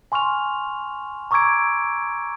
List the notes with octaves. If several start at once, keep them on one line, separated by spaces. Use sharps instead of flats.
G#5 C6 C#6 F6 F7
A#5 C#6 D6 E6 G#6 D7